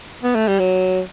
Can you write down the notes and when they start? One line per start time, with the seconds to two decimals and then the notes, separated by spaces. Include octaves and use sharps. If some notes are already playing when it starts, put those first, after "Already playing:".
0.23 B3
0.35 A3
0.47 G3
0.59 F#3